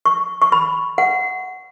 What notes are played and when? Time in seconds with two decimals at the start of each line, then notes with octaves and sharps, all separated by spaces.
0.06 C#6
0.42 C#6
0.52 B5
0.98 F#5